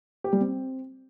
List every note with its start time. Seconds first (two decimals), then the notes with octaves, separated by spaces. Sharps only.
0.24 G4
0.33 G3
0.41 C4